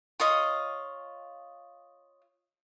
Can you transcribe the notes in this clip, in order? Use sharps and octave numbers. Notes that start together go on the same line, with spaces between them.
F4 C#5 D#5 F5